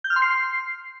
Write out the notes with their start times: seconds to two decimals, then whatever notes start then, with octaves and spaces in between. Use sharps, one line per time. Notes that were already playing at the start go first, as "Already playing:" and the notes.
0.04 G6
0.10 F6
0.16 C6
0.22 C7